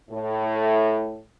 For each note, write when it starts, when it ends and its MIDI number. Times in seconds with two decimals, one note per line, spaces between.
0.11 1.20 45